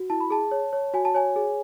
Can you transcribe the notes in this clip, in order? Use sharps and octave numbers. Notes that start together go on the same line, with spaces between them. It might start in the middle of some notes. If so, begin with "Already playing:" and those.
Already playing: F#4
E4 A5
B5
G#4 A5
C#5
C#5
F#4 G#5
A5
C#5 G#5
G#4